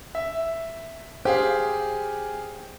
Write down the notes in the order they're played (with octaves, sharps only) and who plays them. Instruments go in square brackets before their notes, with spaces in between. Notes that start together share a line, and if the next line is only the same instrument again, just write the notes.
[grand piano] E5
[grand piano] G4 G#4 F5 [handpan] C5